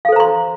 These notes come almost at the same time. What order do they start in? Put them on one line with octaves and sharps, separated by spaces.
F5 A4 C5 A#5 C6